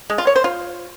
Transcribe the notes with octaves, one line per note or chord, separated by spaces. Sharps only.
G#3
F4
C#5
C5
F4